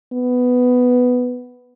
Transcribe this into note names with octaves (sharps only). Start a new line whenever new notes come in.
B3